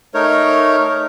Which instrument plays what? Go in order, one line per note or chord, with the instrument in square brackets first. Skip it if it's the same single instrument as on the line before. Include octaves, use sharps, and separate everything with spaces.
[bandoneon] A3 D#4 A#4 C#5